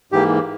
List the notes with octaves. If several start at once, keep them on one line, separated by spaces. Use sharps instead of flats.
G#2 E3 A#3 G4